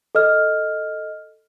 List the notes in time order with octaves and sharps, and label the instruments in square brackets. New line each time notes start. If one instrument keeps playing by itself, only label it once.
[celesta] A4 D#5 F6